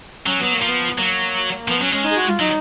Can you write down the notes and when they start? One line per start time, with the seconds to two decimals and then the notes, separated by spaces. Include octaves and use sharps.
0.26 F#3 C#4
0.40 F#3 B3
0.53 A#3
0.62 F3
0.67 B3
0.97 F#3 A#3
1.68 F3 B3
1.80 F#3 C#4
1.92 G#3 C#4
2.04 D#4
2.11 G#4
2.16 F#4
2.28 F4
2.39 F#3 D#4